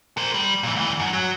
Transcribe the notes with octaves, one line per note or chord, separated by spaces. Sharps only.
A#4 C5
G3
A#2 E3
D2 E3
F#2
F#3